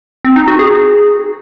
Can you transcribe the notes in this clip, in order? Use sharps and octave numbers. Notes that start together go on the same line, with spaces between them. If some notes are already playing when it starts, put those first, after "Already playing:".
C4
D#4
F#4
G#4